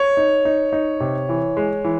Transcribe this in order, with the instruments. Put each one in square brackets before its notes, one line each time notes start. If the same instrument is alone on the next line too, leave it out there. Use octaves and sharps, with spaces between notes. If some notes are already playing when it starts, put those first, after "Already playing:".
Already playing: [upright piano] C#5
[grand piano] D#4
D#4
D#4
C3
E3
G#3
E3